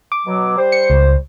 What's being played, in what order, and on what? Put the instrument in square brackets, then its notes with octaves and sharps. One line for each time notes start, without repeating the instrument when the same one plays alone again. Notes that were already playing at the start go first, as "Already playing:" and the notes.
[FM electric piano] D6
[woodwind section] B2 F#3
G3 C5
[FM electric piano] C#7
C#2